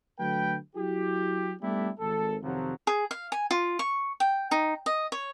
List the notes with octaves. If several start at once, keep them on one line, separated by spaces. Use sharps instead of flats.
D3 F#3 A3 B4 G5
F#3 E4 F#4 G4
G3 A3 B3 D4 E4 G4
G#1 A4
F2 C3 D#3 F3 F#3
G#4
F5
G#5
F4
C#6
G5
D#4
D#5
C#5